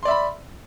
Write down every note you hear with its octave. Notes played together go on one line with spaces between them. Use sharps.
D5 E5 B5 C6